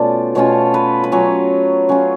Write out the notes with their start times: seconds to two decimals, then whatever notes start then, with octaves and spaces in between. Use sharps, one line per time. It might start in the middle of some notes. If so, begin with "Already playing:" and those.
Already playing: B2 A3 C#4 F4 D5
0.35 B2 A3 C#4 F4 C#5
0.74 B4
1.04 B4
1.12 F#3 C#4 F4 C#5
1.89 F#3 C#4 F4